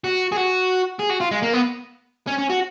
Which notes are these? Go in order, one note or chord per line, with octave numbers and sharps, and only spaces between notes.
F#4
G#4
F#4
G#4
F#4
F4
G#3
A#3
B3
C#4
C#4
F#4